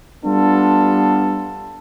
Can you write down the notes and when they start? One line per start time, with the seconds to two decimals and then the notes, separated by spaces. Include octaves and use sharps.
0.24 G3 B3 D4 F4 A4